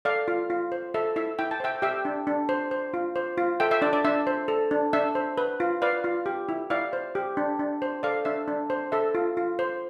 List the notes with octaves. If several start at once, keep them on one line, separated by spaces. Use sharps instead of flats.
A4 D5 F5
F4
F4
C5
A4 E5
E4 E5
E4 G5
A5
C5 E5 G5
G4 E5 G5
D4
D4
C5
C5
F4
C5
F4
A4 E5 G5
E5
D4 D5
D5
D4 E5
C5
A4
D4
D4 E5
C5
B4
F4
B4 D5 F5
F4
G4
E4
E4 D5 F5
C5
G4
D4
D4
C5
A4 D5 F5
D4 E5
D4
C5
A4 E5
F4
F4
C5